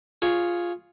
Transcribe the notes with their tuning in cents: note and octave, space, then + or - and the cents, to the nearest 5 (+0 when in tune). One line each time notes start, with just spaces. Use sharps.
F4 +0 G#4 +0 C#5 +0